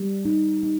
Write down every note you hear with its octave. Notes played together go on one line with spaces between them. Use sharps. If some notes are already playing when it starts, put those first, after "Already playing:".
Already playing: G3
D#4
D#4